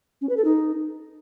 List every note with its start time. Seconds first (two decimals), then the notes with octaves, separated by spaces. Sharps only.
0.21 C#4
0.29 B4
0.37 A4
0.45 D#4